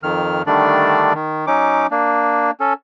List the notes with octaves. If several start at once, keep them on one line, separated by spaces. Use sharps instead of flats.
F2 D#3 F6
D3 D#3 G3 A3 D4 D5
D#3
F#3 C#4 D#4 D6
A#3 D4
C#4 A4